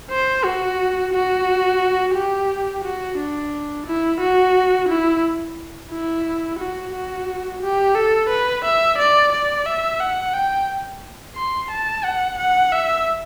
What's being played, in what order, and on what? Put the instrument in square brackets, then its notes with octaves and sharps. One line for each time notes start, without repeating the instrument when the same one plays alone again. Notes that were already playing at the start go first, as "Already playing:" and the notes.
[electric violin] C5
F#4
F#4
G4
F#4
D4
E4
F#4
E4
E4
F#4
F#4
G4
A4
B4
E5
D5
D5
E5
F#5
G5
C6
A5
F#5
F#5
E5